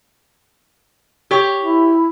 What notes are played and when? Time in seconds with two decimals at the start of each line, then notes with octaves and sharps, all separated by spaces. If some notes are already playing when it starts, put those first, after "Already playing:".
1.31 G4 C#5
1.62 E4